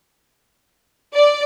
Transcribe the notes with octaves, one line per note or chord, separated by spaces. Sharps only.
D5